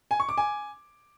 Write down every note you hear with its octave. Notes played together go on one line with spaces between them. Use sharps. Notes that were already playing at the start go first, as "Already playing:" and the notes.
G#5
C#6
D6
G#5